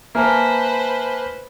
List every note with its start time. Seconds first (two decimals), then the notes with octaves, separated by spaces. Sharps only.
0.15 A#3 B4 C5 E5 G#5 A5